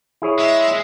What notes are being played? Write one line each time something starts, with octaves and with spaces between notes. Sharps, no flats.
E4 G#4 C#5
G#3 E5